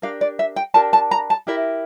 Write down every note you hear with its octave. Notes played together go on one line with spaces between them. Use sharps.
D4 G4 A#4 F5
D5
E5
G5
D4 G4 A#4 A5
A5
A#5
A5
E4 G4 A#4 E5